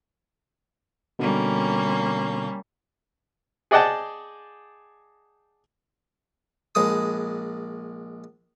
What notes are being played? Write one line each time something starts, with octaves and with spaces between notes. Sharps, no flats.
B2 D3 G3 A#3 C#4
G#4 D5 D#5 F#5 G5 A5
A#1 G#3 D#6